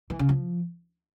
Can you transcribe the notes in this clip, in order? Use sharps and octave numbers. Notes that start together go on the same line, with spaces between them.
E3
C#3
F3